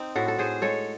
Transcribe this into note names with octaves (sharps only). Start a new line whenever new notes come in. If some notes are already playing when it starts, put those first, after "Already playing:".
Already playing: C4 D#4
A2 F#4 A4
A4
A2 G#4 C5
G#3 A4 C#5